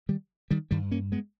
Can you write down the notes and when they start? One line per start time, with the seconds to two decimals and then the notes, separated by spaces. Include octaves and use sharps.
0.09 D#3 G3
0.51 D#3 G3
0.71 G2 D#3 G3
0.91 A#3 C#4
1.12 G#3 B3